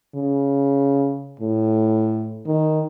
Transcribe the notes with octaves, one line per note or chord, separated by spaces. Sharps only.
C#3
A2
D#3